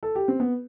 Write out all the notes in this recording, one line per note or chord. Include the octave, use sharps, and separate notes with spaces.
A4
G4
C4
B3